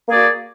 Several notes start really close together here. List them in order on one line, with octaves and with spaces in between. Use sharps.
A#3 G#4 D5 F#4